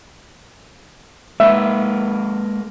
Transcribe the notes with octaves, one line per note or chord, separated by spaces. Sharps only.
G#3 A#3 B4 E5